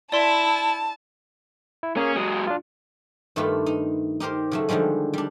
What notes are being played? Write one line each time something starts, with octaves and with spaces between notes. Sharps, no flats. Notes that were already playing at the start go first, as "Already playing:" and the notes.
E4 D5 A5 C6
E4
A#3 C#4 G#4
F#3 G#3 D#6
D4 F4
G2 D#3 A3 D4 F4 B4
D#4
D#4 G4 A#4 C5
C#3 F#3 A3
D3 D#3 F3 G3 G#3
G3 D4